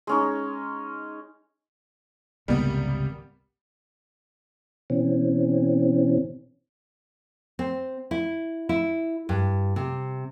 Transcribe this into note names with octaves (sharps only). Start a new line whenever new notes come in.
G#3 C#4 D#4
G#1 C#2 C3 G3 A#3 B3
B2 E3 C4 C#4
C4
E4
E4
G2
C3